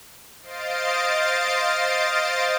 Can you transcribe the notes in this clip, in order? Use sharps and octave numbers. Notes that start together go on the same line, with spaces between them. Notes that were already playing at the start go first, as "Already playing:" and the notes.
C5 D#5 F5 A6 C7 D7